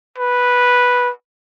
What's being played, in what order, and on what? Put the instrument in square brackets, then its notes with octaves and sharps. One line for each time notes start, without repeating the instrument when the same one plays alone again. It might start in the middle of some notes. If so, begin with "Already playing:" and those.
[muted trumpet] B4